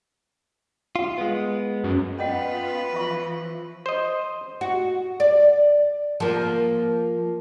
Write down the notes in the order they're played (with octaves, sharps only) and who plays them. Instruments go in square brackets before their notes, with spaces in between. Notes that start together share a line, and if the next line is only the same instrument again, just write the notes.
[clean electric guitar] F4
G#3 B3
[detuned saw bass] F#2
[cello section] B3 F4 [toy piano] C#4 D#5 F#5 [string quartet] B4
[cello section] E3 F3 [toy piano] F4 E5 C#6
[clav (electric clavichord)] C5 D#5
[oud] F#4
D5
F3 A#3